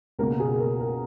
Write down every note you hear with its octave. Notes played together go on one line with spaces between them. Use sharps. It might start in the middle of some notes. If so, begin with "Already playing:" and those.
C#2 B2 A#3 A#4
G#4
A#4
A#4